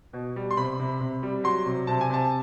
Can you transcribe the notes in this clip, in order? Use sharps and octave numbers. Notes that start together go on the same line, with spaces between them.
B2
G3
C6
C3 B5
C3
C3
G3
F#3 C6
C3
C3 A5
G#5
C3 A5